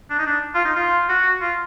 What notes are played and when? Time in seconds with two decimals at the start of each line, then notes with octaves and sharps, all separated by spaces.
0.10 D4
0.19 D#4
0.26 D4
0.55 F4
0.65 D#4
0.76 F4
1.09 F#4
1.41 F4